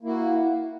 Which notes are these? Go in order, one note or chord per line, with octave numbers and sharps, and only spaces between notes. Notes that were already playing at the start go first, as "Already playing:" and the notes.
A#3 E4 F#4